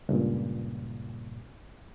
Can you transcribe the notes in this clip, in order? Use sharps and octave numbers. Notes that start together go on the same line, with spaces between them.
C#2 G2 A#2